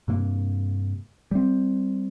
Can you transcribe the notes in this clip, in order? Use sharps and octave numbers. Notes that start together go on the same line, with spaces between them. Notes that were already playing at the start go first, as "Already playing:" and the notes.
G2 C3 A#3
G3 C4